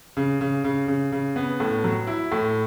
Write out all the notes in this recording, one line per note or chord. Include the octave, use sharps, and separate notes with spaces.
C#3
C#3
C#3
C#3
C#3
B3
A2
F#3
E4
A2